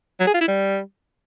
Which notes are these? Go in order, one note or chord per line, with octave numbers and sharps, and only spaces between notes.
F#3
G#4
F4
E4
G3